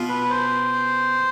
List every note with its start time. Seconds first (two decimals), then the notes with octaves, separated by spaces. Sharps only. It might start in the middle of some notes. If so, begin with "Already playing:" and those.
Already playing: B2 B3 F4
0.09 B4
0.30 C5